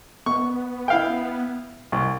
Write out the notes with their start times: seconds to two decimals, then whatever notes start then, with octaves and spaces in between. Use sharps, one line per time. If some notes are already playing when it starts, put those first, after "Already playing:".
0.26 B3 C#6
0.88 E4 F5 G5
1.92 C2